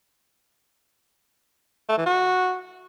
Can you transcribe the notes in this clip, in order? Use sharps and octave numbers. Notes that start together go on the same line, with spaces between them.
A3
E3
F#4